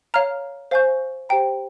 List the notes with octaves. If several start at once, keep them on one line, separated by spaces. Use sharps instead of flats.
C#5 F5 A#5 F6
C5 F5 G#5 C#6 G6
G4 C5 G5 A#5